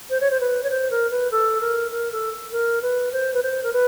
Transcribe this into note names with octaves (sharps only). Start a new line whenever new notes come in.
C5
C#5
C5
B4
C#5
C5
A#4
B4
A4
A#4
A#4
A4
A#4
B4
C5
B4
C5
A#4
B4